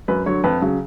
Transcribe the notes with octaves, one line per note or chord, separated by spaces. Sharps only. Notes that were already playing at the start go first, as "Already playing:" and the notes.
F#2 B4
D3 F#3 C#5
F2 B4
C#3 F#3